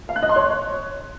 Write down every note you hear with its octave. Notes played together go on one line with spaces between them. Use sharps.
F5
F#6
D#5
C6
C#5